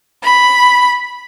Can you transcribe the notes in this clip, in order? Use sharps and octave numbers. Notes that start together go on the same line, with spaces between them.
B5